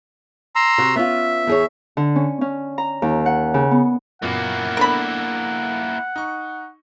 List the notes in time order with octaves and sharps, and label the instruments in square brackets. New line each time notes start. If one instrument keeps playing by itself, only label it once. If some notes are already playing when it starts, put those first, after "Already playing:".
[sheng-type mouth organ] A#5 C6 E6
[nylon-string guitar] C3 F#4
[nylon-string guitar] B3 C#4 F4 [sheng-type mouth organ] E5
[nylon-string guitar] E2 G#4 C#5
[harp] D3
C#4
C#4
A#5
D#2
F#5
C#3
B3
[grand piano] F#2 A#2 B3 [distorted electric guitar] A#3 E4 [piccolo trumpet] F#5
[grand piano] B3 D4 A4 [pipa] A#4 B5
[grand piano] D#4 C#6